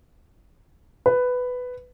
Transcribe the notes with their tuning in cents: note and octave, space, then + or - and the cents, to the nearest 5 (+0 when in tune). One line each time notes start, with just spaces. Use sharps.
B4 +10